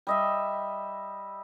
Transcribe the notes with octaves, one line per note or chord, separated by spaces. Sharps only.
G3 D#5 E5